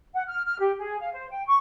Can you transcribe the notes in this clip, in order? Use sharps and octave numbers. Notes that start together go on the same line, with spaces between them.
F#5
F6
F6
G4
G#4
F5
C5
G5
C#6